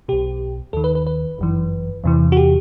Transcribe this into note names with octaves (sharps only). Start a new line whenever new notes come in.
B1 B2 G4
D#2 D#3 A4
B4
B4
B4
G1 F#2 E3
E2 C3 E3
F#4
G4